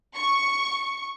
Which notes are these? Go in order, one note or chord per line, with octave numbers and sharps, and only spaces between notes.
C#6